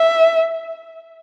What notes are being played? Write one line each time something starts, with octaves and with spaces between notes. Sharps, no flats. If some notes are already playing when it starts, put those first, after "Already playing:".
Already playing: E5